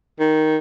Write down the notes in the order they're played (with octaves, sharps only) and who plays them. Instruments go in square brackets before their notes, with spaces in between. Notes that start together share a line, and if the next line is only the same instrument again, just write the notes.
[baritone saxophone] D#3